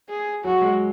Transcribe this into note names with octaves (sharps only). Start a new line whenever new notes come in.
G#4
F#3 F#4
G#3